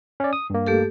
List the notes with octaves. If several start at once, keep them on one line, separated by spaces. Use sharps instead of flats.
C#4 D5
D#6
G2 A#3
A3 G4 A4